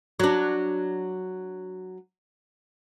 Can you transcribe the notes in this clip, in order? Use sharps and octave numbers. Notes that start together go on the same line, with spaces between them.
F#3 D4